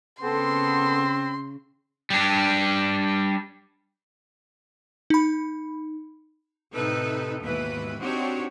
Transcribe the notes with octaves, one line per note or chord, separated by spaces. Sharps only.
C#3 B3 C4 A4 C6
G3 D4
D#4 B5
A2 C3 D#4 A4 B4
D#2 G#2 B2 E3 B4
C4 D4 D#4 F#4 G4 C#5